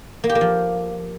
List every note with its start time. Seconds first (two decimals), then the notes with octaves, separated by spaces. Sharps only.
0.24 A#3
0.29 G4
0.35 A#3
0.41 F3